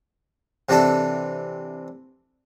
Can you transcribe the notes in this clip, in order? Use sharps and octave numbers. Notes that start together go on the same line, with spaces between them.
C3 E3 D4 A4